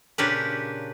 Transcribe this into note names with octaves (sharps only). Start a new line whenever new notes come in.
A#2 C#3 D4 G4 A#4 B4